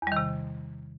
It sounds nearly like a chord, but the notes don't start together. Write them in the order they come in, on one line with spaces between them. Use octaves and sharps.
E2 G3 D#3 C3